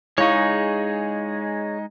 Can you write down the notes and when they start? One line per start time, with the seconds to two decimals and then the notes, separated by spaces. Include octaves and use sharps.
0.18 G#3 D#4 E4 G#4 C#5 F5 C#6